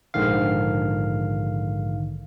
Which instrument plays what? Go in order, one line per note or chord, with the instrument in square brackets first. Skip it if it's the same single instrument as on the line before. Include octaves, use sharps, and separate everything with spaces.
[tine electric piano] A#1 G#2 D3 D#3 F5